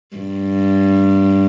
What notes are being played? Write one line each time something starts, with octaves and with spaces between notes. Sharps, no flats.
G2